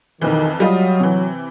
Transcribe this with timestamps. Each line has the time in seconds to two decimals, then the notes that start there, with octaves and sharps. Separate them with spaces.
0.21 B1 F2 D#3 E3
0.60 F#3 G3 F4 D#5
1.00 C3 E3